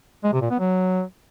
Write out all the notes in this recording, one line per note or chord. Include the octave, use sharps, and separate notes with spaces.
G#3
C3
A#2
B3
F#3